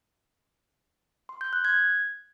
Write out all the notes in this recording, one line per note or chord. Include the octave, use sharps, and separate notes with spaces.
C6
G6
F#6
G#6